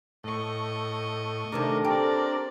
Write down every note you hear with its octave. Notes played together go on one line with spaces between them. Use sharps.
A2 D#5 C#6
C3 D#3 A3 D4 A4 A#4
C4 G4 D5